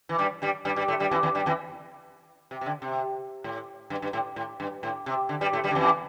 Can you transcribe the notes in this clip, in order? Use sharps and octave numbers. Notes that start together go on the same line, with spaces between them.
E3
G2 G3
G2 G3
G2 G3
G2 G3
A2 A3
G2 G3
E2 E3
E2 E3
G2 G3
E2 E3
C3
C3
D3
C3
A2
G2
G2
A2
A2
G2
A2
C3
D3
G2 G3
A2 A3
G2 G3
D3
E2 E3